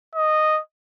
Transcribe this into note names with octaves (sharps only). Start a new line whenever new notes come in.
D#5